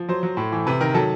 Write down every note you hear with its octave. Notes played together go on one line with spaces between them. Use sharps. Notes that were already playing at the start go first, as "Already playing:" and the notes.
Already playing: F3
F#3 C5
F#3
A2
E3
C3 B4
D#3 A#4
F#3 A4